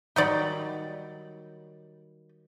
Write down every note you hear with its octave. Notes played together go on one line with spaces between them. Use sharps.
D#3 F#3 G3 D#4 D5 B5